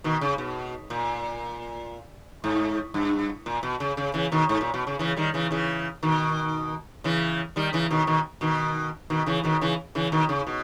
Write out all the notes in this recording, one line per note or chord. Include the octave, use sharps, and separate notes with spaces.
B2 D#3
C#3
B2
A#2
G#2
G2
A#2
B2
C#3
C#3
C#3 E3
B2 D#3
G#2
A#2
B2
C#3
C#3 E3
D#3 G3
C#3 E3
C#3 E3
B2 D#3
C#3 E3
D#3 G3
C#3 E3
B2 D#3
B2 D#3
B2 D#3
B2 D#3
C#3 E3
B2 D#3
C#3 E3
C#3 E3
B2 D#3
C#3
B2